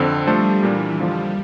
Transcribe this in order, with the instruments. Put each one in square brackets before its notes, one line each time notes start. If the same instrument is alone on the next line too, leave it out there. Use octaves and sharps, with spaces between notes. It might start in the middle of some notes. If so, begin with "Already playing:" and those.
Already playing: [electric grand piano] F2 D3 C4
[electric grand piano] F3 A3 D4 A4 C5 [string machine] G3
[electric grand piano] A#2 G3 A#3 D4 [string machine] E3
[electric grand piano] F2 D3 F3 A#3 F4 [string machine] G3